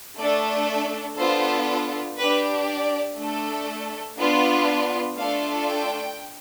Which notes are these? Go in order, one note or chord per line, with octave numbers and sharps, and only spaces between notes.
A3 D4 A4 D5
E5
B3 D4 F4 A4 C5
D4 G4 B4
D5
A3 D4 A4
B3 D4 F4
A3 D4 F4 A4 F5
G5